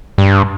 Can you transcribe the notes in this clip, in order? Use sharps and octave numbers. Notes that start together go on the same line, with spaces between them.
G2